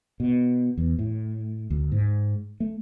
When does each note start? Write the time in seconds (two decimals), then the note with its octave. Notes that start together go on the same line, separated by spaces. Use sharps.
0.20 B2
0.77 E2
0.99 A2
1.70 D2
1.92 G#2
2.60 A3